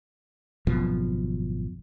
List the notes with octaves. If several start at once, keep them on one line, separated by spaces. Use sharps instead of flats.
G#1 F#2 B2 F3